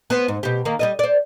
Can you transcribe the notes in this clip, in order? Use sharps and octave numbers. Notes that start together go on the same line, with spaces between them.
B3 C5
G#2
B2 G4
D#3 A#3
G3 A4 D#5
C5 D5